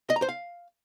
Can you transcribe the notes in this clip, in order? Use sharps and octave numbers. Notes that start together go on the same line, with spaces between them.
D#5
A#5
C5
F5